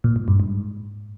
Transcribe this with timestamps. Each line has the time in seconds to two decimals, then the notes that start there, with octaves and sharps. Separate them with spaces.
0.04 A#2
0.16 G#2
0.28 G2
0.40 G#2